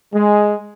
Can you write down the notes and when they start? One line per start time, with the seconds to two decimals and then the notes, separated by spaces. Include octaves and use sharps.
0.14 G#3